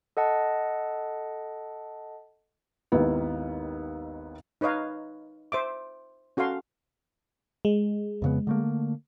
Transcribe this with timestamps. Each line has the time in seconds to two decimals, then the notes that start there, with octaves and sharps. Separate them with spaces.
0.17 A4 D#5 F#5 A5
2.92 G#1 D#2 D#3 B3 E4
4.61 D#4 B4 C#5 D#5 F5
5.52 C5 E5 D6
6.37 C#4 F#4 A4 F5 C6
7.65 G#3
8.22 F2 C#3 B3
8.47 D3 A3 A#3